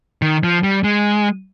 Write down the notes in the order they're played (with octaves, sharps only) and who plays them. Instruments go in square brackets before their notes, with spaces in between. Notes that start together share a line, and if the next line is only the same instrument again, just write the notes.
[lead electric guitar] D#3
F3
G3
G#3